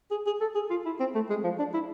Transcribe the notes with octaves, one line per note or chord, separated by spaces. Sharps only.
G#4
G#4
A4
G#4
F4
E4
C4
A3
G#3
F3
D4
E4